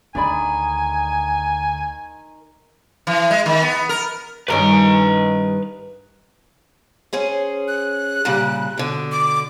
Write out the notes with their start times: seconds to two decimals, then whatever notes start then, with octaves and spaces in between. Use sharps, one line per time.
0.15 D2 D#3 D4 D5 G#5 B5
3.07 E3
3.31 G#3
3.46 D#3
3.62 B3
3.89 A#4
4.48 G2 D#3 C#4 B4 A#5
7.13 C#4 G#4 C5
7.68 F#6
8.25 A#2 C#3 G3
8.77 B2 D3
9.12 D6